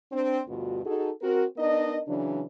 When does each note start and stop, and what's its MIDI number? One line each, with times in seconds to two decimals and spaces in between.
0.11 0.40 60
0.11 0.40 62
0.48 0.80 38
0.48 0.80 43
0.48 0.80 47
0.48 0.80 65
0.48 0.80 66
0.85 1.11 63
0.85 1.11 66
0.85 1.11 68
0.85 1.11 69
1.22 1.44 60
1.22 1.44 66
1.22 1.44 70
1.57 1.99 59
1.57 1.99 62
1.57 1.99 63
1.57 1.99 70
1.57 1.99 75
2.07 2.42 49
2.07 2.42 52
2.07 2.42 54
2.07 2.42 62